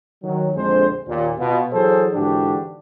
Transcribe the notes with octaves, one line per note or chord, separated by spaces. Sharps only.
D#3 F#3
A#1 F2 D3 G#3 C5
D#2 A#2
B2 F4
E3 F#3 G#4 A4 C5
G#2 D3 E3 D4 F#4 G4